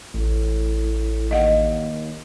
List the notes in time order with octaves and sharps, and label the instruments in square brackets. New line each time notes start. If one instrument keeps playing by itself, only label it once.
[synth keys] A1 [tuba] A2
[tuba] D#2 [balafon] D#5 F5 F#5